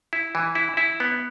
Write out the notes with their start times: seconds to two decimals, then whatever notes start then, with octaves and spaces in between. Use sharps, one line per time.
0.13 E4
0.35 E3
0.55 E4
0.77 E4
1.00 B3